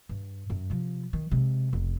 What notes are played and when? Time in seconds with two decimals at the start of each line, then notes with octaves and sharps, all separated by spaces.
0.09 G2
0.50 F#2
0.70 C3 F3
1.13 D#3
1.31 C3 G#3
1.73 F1 C#3